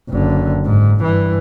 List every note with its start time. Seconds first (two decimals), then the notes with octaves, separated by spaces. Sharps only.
0.10 F#1 D3
0.66 G#2
1.02 G2 E3